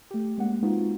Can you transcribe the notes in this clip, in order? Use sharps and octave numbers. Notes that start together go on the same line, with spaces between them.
A3 G4
G#3 A#3 C#4 F#5
G#3 B3 C4 D#4 F4 F#4